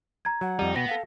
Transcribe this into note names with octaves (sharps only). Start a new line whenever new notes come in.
A#5 G#6
F#3 F#5
F2 G3 D#4
B2 B3 G5 A#6
A4 F5 G5